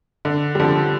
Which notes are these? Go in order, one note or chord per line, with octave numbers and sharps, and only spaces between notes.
D3
G3
D3 F3